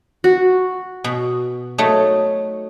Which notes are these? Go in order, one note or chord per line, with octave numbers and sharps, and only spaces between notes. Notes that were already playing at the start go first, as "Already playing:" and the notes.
F#4
B2
F#3 A3 D#4